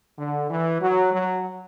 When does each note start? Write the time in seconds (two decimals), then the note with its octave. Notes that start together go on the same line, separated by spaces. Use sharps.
0.19 D3
0.50 E3
0.81 F#3
1.13 F#3